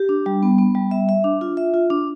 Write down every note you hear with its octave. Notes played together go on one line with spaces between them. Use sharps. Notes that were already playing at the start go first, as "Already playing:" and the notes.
Already playing: G4
D4
G3
B3
B3
G3
E5
E5
D4
F4
E5
F4
D4